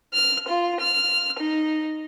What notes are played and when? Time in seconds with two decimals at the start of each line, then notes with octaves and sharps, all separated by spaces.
0.14 F6
0.48 F4
0.81 F6
1.39 D#4